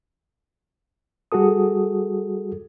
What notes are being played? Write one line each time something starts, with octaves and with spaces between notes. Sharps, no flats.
G3 F#4 G#4 A4 D#6